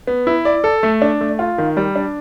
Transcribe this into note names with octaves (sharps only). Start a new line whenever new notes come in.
B3
E4
D5
A4
A3
D4
A3
F4
D#3
G3
D4